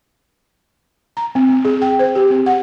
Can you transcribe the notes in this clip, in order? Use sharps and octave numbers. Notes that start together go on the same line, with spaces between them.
A#5
C4
C4
G#4
G5
C5
G4
C4
F#5